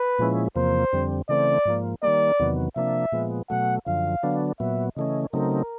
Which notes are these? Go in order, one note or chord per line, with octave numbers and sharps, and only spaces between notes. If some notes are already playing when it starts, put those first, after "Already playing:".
Already playing: B4
A#2 F3 G#3 C#4 E4
E2 C3 F3 A#3 C5
F2 D3 G3 C4
C#3 E3 A3 C4 D5
G#2 F3 A#3
D#3 G3 A#3 D5
E2 C3 D#3 F#3 B3
C3 F3 A#3 D4 E5
A#2 F3 G#3 B3
B2 F#3 A3 F#5
F#2 D3 F3 F5
D3 F#3 B3 D4
A#2 F#3 B3 E5
C#3 E3 A3 C#4 D#5
C#3 F#3 A3 C4 D#4 A#4